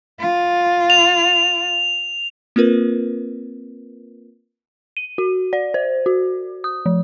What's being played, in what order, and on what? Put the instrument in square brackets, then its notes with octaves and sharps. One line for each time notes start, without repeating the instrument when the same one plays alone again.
[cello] F4
[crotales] F7
[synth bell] A#3 C4 F4 A#4 B4
D#7
F#4
D5
C5
F#4
D#6
F3